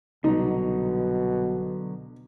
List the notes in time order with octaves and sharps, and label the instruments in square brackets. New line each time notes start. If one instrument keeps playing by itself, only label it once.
[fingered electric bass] C2 [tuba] B2 [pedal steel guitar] D3 F#3 [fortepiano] D#4